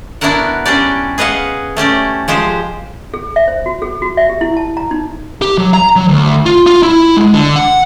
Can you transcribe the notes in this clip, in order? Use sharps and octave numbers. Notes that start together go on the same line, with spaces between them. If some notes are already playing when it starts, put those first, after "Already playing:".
B3 D4 E4 F#4 A#4 F#5
G3 C#4 D4 G4 D5
G#4 B4 D#5 F5 F#5
A3 C#4 G4 D5
F3 G#3 G4 C5
G#4
E5
C5
F#4
G#4
F#4
E5
G4
E4
A5
A#5
D#4
G4
F#3
A#5
F#3
D2
F4
F4
E4
G#3
D3
F#5